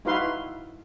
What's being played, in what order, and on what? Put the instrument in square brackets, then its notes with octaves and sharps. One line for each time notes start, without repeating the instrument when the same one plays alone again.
[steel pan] D#4 E4 F#4 B4 F5 C6